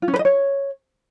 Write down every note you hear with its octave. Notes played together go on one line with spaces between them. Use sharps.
F4
C#4
B4
D#5
C#5